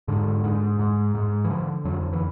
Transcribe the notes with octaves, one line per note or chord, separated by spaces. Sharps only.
G#2 D3
G#2
G#2
G#2
E3
D3 F3
F2 F#3
E3